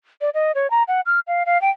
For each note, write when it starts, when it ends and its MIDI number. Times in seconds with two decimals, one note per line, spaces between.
0.21 0.30 74
0.34 0.52 75
0.55 0.70 73
0.71 0.83 82
0.88 1.01 78
1.06 1.20 89
1.28 1.43 77
1.46 1.60 77
1.62 1.70 79